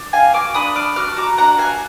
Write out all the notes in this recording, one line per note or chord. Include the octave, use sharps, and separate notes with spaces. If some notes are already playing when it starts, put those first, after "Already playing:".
Already playing: D4
F#4 F5 G#5
F#4 D6 F6
D4 B5 D#6
D4 D6 F6
F#4 D6 F6
F#4 A#5 D6
D4 F#5 A#5
F#4 F5 G#5